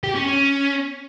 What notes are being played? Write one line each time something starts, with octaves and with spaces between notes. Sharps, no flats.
G4
C#4
C#4